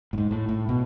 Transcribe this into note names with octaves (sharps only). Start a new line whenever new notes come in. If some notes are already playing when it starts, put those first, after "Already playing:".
A2
G#2
A2
A2
B2